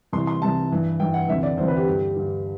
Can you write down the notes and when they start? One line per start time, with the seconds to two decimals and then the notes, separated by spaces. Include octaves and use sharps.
0.13 C2 C3 E3 C6
0.27 C6
0.42 C2 C3 E3 A5
0.71 G2 E3
1.00 G2 E3 G5
1.14 F#5
1.28 D2 C3 E3 E5
1.43 D5
1.57 D2 C3 E3 C5
1.68 B4
1.77 G4
1.87 G2 D3
2.16 G2 D3